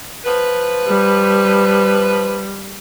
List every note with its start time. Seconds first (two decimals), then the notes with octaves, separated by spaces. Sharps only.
0.25 F3 B4
0.87 G3